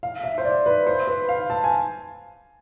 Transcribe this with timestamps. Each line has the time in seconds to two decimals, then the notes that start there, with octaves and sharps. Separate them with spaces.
0.03 F5
0.24 E5
0.38 C5
0.45 D5
0.66 B4
0.87 C5
1.07 B4
1.29 F5
1.50 A5
1.64 G#5